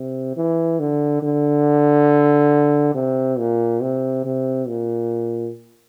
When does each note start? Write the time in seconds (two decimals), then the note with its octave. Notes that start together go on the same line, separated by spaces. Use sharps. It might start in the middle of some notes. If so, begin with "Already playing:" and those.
Already playing: C3
0.37 E3
0.79 D3
1.23 D3
2.94 C3
3.38 A#2
3.82 C3
4.24 C3
4.68 A#2